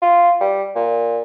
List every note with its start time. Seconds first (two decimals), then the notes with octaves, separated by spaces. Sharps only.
0.02 F4
0.41 G3
0.75 A#2